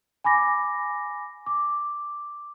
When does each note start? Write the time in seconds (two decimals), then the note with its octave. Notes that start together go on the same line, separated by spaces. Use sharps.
0.24 G#5 B5 D6 A#6
1.46 D6